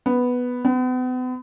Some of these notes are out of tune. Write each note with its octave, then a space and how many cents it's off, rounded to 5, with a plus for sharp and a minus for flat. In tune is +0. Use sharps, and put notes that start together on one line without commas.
B3 +0
B3 +40